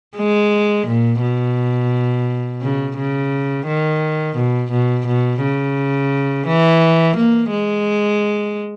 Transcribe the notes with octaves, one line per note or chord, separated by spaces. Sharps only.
G#3
A#2
B2
C#3
C#3
D#3
B2
B2
B2
C#3
E3
A#3
G#3